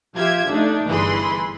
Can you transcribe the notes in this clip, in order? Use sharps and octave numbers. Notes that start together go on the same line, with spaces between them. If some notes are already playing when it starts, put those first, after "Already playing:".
F3 F4 G4 E5 G#6
A3 D4 D#4
G1 E3 G#4 B5 C6